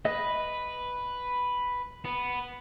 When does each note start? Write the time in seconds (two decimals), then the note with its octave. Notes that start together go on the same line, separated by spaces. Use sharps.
0.05 B4 D#5
2.05 B3